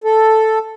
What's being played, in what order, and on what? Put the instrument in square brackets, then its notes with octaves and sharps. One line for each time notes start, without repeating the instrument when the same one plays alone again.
[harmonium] A4